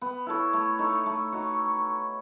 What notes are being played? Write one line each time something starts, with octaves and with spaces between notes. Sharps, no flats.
B3
E4 A4 C#5
A3
D#4 A4 C#5
A3
D#4 F#4 C#5